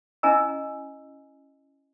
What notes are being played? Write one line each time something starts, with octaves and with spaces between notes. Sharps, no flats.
C#4 E4 D#5 G#5 A#5 E6